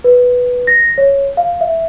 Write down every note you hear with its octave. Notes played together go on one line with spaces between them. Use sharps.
B4
A#6
C#5
F5
E5